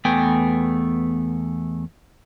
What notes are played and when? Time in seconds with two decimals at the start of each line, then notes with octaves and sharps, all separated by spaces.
0.05 E2 A3 B3 G5 G#5